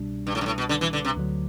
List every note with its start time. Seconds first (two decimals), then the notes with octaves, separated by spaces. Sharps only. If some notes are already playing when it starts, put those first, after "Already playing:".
Already playing: C2 B2 G3 D4
0.27 G2
0.35 A2
0.41 G2
0.46 A2
0.58 B2
0.69 D3
0.81 E3
0.93 D3
1.05 C3
1.16 D2 D3 F#3